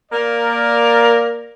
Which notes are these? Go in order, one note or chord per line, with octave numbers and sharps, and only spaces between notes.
A#3 A#4 D5